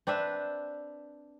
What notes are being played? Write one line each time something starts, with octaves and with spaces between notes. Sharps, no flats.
C4 D4 B4 E5